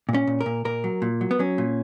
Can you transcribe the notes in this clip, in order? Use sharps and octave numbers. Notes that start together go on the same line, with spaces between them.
A#2
C#4
A#2
A#4
A#2
A#2 A#4
F#3
A#2
F#3
B3
F#3 C#4
A#2